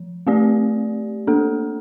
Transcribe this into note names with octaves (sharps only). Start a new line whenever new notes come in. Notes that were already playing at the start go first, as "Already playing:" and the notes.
Already playing: F3
A3 C4 G4 D5
A#3 D4 A4